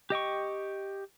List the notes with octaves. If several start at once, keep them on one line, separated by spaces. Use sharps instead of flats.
G4 D#5 G5 C#6